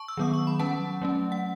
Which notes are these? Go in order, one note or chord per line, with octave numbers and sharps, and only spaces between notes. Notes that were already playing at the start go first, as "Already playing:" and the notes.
Already playing: A5 C#6
E6
D#3 F#3 B3 D#6
C#6
B5
F#3 C#4 F#5 A5
F#3 A3 C#4
F#5